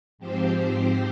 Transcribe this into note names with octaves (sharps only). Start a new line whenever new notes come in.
G#2 F3 C4 G4 C5